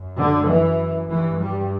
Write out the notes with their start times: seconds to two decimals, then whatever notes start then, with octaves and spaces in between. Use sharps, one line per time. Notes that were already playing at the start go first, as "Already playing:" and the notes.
Already playing: F#2
0.18 D3
0.48 E3
1.09 G2 E3
1.40 G3